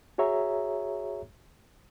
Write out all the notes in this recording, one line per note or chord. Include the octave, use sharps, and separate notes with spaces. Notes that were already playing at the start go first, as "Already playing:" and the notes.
F#4 G#4 C#5 E5 A#5